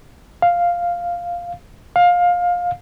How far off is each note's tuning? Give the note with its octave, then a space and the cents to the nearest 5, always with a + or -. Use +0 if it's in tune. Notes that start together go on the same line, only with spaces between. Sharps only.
F5 +0
F5 +20